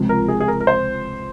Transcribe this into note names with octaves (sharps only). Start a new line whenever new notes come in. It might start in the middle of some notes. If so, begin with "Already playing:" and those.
Already playing: C#2 C3 F3
A#4
G#4
G#4
A#4
A#4
C5